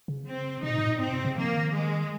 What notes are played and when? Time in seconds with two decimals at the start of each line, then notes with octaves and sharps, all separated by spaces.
0.08 C#3
0.27 C4
0.63 C3 D#4
0.70 A#2
0.78 G#2
0.85 A#2
1.00 G#2 C4
1.12 C3
1.25 C#3
1.37 F3 A#3
1.55 D#3
1.73 G#3